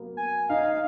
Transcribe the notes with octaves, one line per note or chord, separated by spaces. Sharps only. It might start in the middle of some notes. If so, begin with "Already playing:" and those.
Already playing: F#3 A#3 B3
G#5
D#4 F5